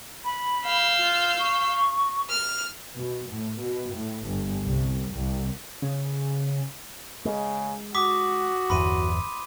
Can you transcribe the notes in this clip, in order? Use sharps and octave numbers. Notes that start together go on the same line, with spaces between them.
B5
F5 E6 G6
F4
C#6
F6
B2
A2
B2
A2
G1
C2
C2
C#3
C#3 G#3
F#4 D6 D#6 B6
G1 E2 B5 C6 D#7